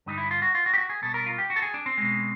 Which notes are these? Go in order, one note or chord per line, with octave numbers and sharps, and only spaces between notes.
G2 D3 G3 D#4
E4
F4
F#4
F4
F#4
G4
F#4
G#4
B2 G3 A4
A#4
F4
G4
F#4
A4
G#4
D4
C4
B2 G#3